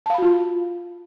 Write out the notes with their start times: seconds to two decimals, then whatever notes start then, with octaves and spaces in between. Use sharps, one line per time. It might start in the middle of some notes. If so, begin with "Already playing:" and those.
0.06 A5
0.10 F5
0.14 B5
0.18 F#4
0.22 F4